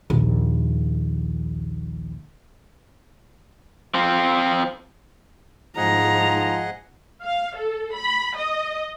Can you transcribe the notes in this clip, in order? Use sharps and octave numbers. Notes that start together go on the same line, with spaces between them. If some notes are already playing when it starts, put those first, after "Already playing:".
A#1 D#2
F3 C4
G#2 F3 G#4 D#5 F#5 A#5
F5
A4
B5
D#5